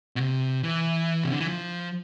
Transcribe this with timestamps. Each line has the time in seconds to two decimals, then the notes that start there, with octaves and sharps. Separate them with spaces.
0.16 B2
0.21 C3
0.63 E3
1.24 C3
1.32 D3
1.40 E3
1.48 F3